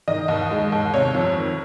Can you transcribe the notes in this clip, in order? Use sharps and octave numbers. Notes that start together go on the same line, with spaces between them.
D#3 D#5
D#2
G#3
D#2
C3 C#5
F2
D#3